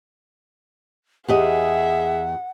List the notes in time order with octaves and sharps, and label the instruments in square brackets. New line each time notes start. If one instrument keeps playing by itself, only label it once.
[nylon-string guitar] E2 G4 D#5 [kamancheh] G#4 E5 [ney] F#5